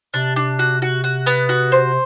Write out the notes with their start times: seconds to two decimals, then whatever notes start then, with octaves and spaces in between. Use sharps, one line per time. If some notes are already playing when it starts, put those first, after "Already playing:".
0.14 C3 D4
0.36 D4
0.59 F#4
0.82 F#4
1.04 F#4
1.26 B3
1.49 F#4
1.72 C5